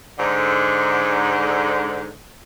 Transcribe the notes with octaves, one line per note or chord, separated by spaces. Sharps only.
G#2 D3